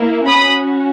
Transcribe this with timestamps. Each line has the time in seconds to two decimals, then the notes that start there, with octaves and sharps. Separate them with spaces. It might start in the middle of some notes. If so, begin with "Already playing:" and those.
Already playing: A#3 E4
0.26 C#4 F#4 B5 D#6